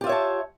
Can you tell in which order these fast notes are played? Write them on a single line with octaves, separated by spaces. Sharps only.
G4 F4 E5 C#5 A5